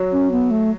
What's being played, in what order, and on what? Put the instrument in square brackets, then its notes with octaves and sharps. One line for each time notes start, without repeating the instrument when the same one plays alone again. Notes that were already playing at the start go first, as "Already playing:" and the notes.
Already playing: [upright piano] F#3
[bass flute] C#4
B3
A3